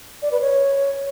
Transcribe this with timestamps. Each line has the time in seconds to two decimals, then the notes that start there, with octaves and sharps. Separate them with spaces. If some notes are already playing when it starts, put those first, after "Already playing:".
0.22 D5
0.32 B4
0.41 C#5